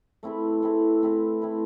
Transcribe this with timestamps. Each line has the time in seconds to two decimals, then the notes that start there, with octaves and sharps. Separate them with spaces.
0.23 A3 C4 E4 B4
0.62 A3 C4 E4 B4
1.02 A3 C4 E4 B4
1.42 A3 C4 E4 B4